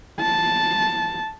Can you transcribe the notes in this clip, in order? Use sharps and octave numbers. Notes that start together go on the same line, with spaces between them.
A5